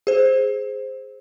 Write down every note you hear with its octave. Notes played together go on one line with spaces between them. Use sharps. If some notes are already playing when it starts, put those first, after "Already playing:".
G#4 C5